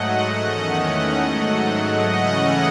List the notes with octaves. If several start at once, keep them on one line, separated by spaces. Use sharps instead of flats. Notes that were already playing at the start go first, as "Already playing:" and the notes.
Already playing: G#2 F#3 A3 D#5 F#5
E2 D#3 A3 C#4
G#2 F#3 A3
C#3 E3 A3 C#4 D#5 F#5